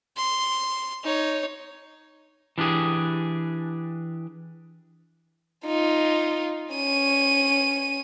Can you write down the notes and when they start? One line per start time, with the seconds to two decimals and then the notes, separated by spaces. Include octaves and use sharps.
0.17 C6
1.04 D#4 C#5
2.58 E3 D4 G4 G#4
5.66 D#4 F4
6.74 C#4 D#7